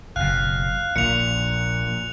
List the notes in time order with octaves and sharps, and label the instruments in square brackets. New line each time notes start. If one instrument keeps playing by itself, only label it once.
[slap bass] F#1 B2 [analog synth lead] F5 [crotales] F#6
[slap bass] A#1 [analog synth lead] A#2 [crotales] C#7 F7